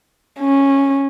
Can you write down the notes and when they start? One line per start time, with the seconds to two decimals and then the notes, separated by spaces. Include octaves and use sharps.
0.40 C#4